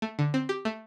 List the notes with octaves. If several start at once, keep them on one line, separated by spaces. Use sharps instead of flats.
A3
D3
C4
G4
A3